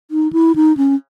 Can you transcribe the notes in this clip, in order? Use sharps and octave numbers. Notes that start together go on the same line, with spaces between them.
D#4
E4
D#4
C#4